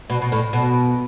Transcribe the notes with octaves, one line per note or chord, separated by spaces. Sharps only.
B2
B2
A2
B2